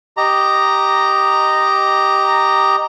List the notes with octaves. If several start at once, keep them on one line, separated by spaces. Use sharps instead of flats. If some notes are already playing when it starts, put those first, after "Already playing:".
G4 D#5 A#5